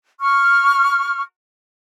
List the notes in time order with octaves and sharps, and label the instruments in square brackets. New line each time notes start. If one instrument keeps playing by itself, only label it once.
[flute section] C#6 F6